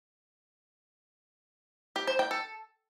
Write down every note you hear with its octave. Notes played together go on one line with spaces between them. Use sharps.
G4
C5
G5
A4